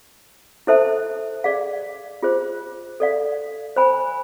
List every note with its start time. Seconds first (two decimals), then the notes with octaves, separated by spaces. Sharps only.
0.67 E4 A4 C5 E5 A5
1.44 G#4 D5 F5
2.23 F4 G#4 C5
3.00 A4 D5 F5
3.76 C5 G#5 B5